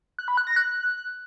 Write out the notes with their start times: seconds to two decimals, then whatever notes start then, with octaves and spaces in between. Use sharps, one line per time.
0.19 F#6
0.28 B5
0.37 F#6
0.47 A#6
0.56 F#6